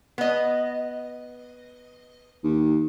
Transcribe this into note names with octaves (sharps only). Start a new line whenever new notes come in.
B3 D#5
D#2